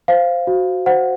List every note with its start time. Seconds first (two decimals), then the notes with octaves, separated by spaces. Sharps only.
0.08 C5 F5
0.47 F#4
0.86 C5 F#5